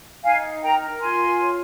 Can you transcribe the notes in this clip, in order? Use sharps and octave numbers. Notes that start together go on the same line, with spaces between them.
D#4 F5 G#5
A#4 G5 A#5
F4 G#5 C6
C#5